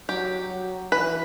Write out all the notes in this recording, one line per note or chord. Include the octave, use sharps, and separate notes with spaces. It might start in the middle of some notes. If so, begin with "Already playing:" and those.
F#3 G4
F#3
E3 B4